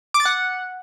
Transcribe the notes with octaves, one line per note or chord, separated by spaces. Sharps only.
D6
A6
F#5